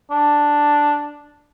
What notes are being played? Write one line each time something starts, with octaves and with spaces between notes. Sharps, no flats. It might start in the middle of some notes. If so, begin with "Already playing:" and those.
D4